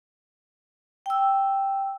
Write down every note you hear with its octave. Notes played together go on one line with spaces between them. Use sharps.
G5 E6